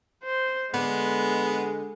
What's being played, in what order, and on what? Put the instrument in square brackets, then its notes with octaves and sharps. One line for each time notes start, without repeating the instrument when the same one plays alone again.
[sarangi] C5
[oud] D3 [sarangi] G#3 [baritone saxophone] B3